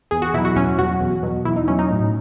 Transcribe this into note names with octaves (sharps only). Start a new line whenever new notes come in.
E2 G#4
F#4
B2 F#3 E4
F#4
E2 C#4
B2 F#3 F#4
E2
B2 F#3
E2 E4
D#4
B2 F#3 C#4
D#4
A2